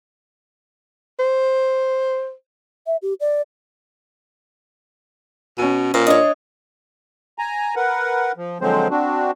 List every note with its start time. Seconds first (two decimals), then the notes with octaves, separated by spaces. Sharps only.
1.20 C5
2.87 E5
3.02 G4
3.20 D5
5.58 B2 C#4 D#7
5.94 A#2 C5
6.07 D4 C#5 D#5
7.38 G#5 A#5
7.76 A#4 B4 F#5
8.37 F3
8.61 D3 F3 F#3 G#3 C4 C5
8.90 C4 D4 F#4